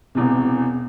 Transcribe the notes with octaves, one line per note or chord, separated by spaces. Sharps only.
E1 E2 C3